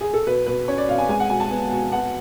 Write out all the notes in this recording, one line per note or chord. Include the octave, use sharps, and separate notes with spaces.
G#4
A4
B2 B4
B2 B4
C#4 C#5
D5
B2 F5
G#5
G#3 G#5
F#5
B2 G#5
A5
B3
B2
B3 F#5